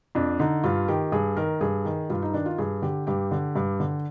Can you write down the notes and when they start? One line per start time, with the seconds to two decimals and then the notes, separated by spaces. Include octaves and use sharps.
0.15 F2 D4
0.39 D3 D#4
0.63 G2 F4
0.88 D#3 G4
1.12 G2 G#4
1.36 D#3 A#4
1.61 G2 G#4
1.85 D#3
2.10 G2 F4
2.22 D#4
2.34 D#3 D4
2.46 F4
2.58 G2 G#4
2.82 D3 G4
3.07 G2 G4
3.31 D3
3.56 G2
3.80 D3